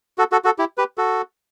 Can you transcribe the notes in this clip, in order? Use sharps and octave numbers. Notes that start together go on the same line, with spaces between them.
F#4 A4
F#4 A4
F#4 A4
E4 G4
G4 B4
F#4 A4